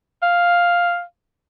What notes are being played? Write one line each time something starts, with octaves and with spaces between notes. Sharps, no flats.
F5